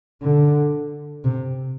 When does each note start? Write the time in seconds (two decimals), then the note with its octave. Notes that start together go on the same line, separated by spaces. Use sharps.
0.22 D3
1.24 C3